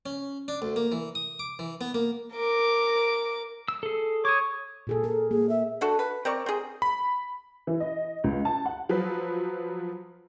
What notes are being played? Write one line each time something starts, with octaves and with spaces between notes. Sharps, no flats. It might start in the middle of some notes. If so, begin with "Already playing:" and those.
C#4
D4
D2
A#3
E3
D#6
D6
E3
B3
A#3
A#4 D6
E6
G#4 A4
C#5 D6 D#6
A#2 G#4 A4
A4 A#4
A#3 G#4
E5
D4 F#4 A4
B4
C4 A#4 D5 C#6
C4 G#4
B5
E3
D#5
C#2
A5
F#5
F3 F#3 B4